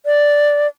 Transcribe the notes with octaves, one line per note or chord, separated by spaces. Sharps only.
D5